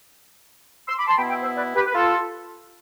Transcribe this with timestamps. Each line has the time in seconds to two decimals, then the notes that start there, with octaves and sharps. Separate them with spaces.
0.88 C6 E6
0.98 B5 D6
1.08 A5 C6
1.17 B2 B3 E4 G5 B5
1.30 E5 G5
1.43 C5 E5
1.56 B4 D5
1.75 G4 B4
1.86 B4
1.95 F4 A4